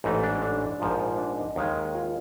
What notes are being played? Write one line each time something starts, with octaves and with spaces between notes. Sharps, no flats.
A1 G#2 E3 A3 D#4
D4
D4
A#1 G#2 F3
D4
D#4
D#2 D#3 G#3
F4